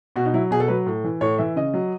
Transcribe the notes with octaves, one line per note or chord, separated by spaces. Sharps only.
B2 F#4
D#4
F#3 E4
B2 G#4
A4
F#3 B4
A2
E3
A2 C#5
E3 E5
C#3 D#5
F#3